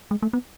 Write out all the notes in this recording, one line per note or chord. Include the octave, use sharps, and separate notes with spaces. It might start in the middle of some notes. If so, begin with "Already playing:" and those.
G#3
A3
B3